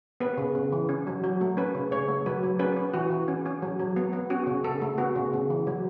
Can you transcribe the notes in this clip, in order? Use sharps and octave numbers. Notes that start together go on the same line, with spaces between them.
B3 B4
C#3
C#3
E3
C#4
F#3
F#3
A3
C#4 B4
C#3
C#3 C#5
A3
F#3 B4
F#3
C#4 B4
C#4
E3 F#4
E3
C#4
C#4
F#3
F#3
B3
B3
C#4 F#4
C#3
C#3 A4
A3
B3 F#4
C#3
C#3
E3
F#3